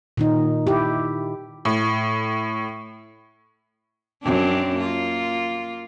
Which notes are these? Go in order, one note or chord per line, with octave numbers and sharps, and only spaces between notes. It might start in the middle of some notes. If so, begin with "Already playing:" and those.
A#2 D#3 D#4
E4 G4
A2
F#2 C4 D4
A#3 F4